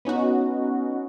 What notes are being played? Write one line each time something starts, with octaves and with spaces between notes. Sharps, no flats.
B3 C#4 D#4 F#4